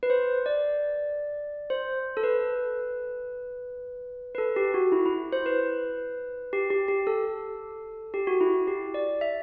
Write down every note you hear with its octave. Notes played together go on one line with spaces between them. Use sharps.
B4
C5
D5
C5
A4
B4
B4
A4
G4
F#4
E4
E4
C5
B4
G4
G4
G4
A4
G4
F#4
E4
G4
D5
E5